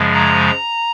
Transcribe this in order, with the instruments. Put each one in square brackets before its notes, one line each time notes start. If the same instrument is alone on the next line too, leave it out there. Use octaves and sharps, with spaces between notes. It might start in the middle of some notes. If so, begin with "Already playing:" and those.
Already playing: [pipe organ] F#2 C#3 F3 G#3
A#5